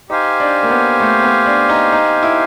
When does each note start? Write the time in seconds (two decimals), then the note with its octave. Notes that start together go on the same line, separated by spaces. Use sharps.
0.10 D#4 G4 C5 F5 G#5
0.40 D4
0.63 A#3
0.70 B3
1.00 A3
1.23 B3
1.46 D4
1.69 D#4
1.92 D#4
2.23 E4